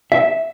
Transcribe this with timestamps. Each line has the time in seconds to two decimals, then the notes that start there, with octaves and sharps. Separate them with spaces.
0.12 E5